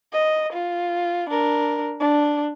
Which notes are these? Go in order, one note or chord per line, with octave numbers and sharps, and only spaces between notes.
D#5
F4
D4 A#4
D4